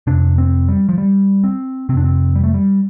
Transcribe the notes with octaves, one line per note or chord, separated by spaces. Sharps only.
F2 C3 D4
C4
G3
F3
G3
C4
F2 C3 C4 D4
C4
G3
A3
G3